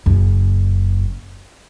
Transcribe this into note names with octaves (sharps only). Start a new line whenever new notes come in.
F#1 F#2